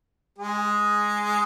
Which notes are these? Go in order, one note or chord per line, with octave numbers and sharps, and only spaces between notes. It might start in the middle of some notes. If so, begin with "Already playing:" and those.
G#3 G#4